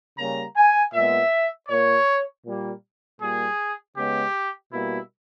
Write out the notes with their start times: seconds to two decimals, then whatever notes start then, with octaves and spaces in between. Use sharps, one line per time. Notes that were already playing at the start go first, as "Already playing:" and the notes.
0.18 C#3 G3 A#3 A#5
0.56 G#5
0.94 A#2 G#3 B3 E5
1.69 A#2 A#3 C#5
2.45 A#2 G3 A#3
3.21 A#2 G3 A#3 G#4
3.96 C#3 G#3 B3 G4
4.72 B2 G3 A#3 E4